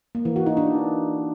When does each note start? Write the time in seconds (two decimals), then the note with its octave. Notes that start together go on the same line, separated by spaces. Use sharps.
0.15 A#3
0.25 E3
0.36 F#4
0.46 D#4
0.57 D4